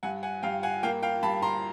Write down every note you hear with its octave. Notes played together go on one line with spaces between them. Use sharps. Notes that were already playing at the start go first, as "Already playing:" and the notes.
G2 F#5 G#5
F#5 G#5
G2 F5 G5
F#5 G#5
A#3 F5 G5
F5 G5
G2 A5 B5
A#5 C6